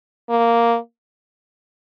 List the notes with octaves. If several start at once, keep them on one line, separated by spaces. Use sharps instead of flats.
A#3